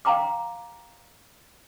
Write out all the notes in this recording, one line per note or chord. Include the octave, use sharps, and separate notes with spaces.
F5 G5 A#5 C6 D6